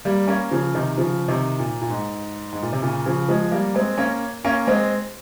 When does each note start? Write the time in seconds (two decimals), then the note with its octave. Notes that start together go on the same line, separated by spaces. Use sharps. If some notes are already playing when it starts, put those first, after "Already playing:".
0.05 G3 A#3
0.28 A#3 C#4
0.51 C#3 F3
0.74 C3 D#3
0.97 C#3 F3
1.28 C3 D#3
1.59 A#2
1.82 A#2
1.90 G#2
2.53 G#2
2.62 A#2
2.73 C3
2.82 A#2 C#3
3.06 C#3 F3
3.29 F3 G#3
3.52 G3 A#3
3.75 G#3 C4
3.98 A#3 C#4
4.44 A#3 C#4
4.67 G#3 C4